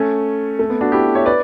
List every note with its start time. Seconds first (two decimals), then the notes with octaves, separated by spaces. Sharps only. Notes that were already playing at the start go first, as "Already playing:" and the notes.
Already playing: A3 C#4
0.59 A3
0.70 B3
0.81 D4 F#4
0.92 E4 G4
1.15 C#5 E5
1.26 B4 D5